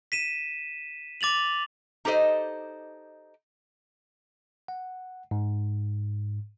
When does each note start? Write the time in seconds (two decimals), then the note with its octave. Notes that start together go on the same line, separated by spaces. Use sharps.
0.12 B6 D#7 E7
1.21 D6 A6 F7 F#7
2.05 D#4 G4 A4 C5 D#5
4.68 F#5
5.31 G#2